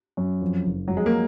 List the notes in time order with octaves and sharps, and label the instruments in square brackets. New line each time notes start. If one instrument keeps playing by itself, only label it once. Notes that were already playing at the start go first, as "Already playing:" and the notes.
[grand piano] F#2
F2
F#1
[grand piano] F2 [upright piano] F#3
[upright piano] G#3
A#3